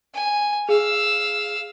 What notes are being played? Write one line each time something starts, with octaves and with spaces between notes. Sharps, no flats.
G#5
G#4 F5 E6